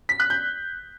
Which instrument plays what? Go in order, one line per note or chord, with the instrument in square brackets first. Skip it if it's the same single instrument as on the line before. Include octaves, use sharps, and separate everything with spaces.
[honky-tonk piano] B6
F#6
G6